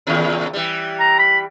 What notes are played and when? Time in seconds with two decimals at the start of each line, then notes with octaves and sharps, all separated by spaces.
0.07 D#2 A#2 C#3
0.53 E3 G3
1.00 A#5
1.19 B5